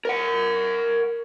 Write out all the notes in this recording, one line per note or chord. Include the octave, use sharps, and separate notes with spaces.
A#4 F#5